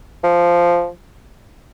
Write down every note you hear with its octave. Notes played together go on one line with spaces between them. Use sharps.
F3